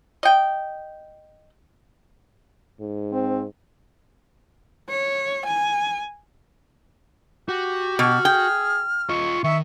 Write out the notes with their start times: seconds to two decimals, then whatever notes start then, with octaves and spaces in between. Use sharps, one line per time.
0.23 D#5 G5
2.80 G#2
3.12 C4
4.90 C#5
5.46 G#5
7.49 F#4 G4
7.99 B2 F6
8.25 G#4 G5
9.09 F4 D#5 C#6
9.44 D#3 E5 C#6